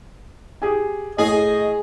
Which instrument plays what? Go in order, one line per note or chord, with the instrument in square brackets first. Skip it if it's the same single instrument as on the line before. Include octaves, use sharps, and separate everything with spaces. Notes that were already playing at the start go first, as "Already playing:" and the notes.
[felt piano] G4 G#4 G#5
[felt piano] A2 [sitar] G#4 [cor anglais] D#5